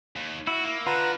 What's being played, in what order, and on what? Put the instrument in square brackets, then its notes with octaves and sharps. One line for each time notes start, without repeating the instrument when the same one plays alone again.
[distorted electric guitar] D#2
[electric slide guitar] E4 [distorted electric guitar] F#4
[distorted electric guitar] A#3
[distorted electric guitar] D3 [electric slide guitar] F4 [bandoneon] B4 F#5 A#5